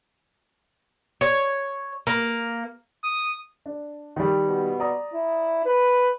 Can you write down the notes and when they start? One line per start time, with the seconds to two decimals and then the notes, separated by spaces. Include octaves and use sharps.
1.21 C#5
2.07 A#3
3.04 D#6
3.66 D4
4.16 D#3 G3
4.48 B2
4.80 D5 A#5 D#6
5.13 E4
5.65 B4